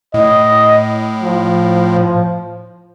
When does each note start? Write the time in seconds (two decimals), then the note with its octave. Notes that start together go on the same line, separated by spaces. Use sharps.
0.14 A2 D#5
1.23 F3